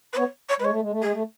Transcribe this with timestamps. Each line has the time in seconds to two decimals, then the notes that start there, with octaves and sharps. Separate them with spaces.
0.13 B4
0.17 B3 C#5
0.49 C#5
0.60 G#3 B4 C#5
0.70 A3
0.81 G#3
0.91 A3
1.02 G#3 G#4
1.12 A3